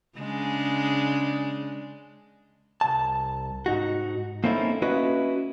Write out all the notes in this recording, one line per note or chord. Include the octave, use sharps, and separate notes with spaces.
C#3 G#3 D4
C2 A5
G#2 D#4 F#4
A#3 C4 C#4 D#4 E4 A4
A#3 C#4 E4 F#4 B4 D#5